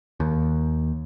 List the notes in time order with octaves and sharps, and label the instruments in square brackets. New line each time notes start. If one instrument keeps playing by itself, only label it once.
[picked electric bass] D#2